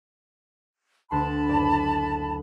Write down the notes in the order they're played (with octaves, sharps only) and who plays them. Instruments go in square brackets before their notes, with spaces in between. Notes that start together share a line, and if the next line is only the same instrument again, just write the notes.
[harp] D2 C6 [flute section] A5 B5
[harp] F#1 D5